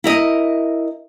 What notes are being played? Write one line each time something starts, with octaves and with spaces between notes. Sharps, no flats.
E4 A#4 D#5